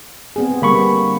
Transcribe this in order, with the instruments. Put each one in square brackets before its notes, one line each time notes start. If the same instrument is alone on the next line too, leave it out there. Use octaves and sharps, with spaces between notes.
[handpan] B3 C4 G#4
[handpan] D3 G3 B3 [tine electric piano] A#3 B5 C#6